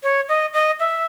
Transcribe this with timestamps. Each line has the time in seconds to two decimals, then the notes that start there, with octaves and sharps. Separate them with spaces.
0.03 C#5
0.29 D#5
0.54 D#5
0.80 E5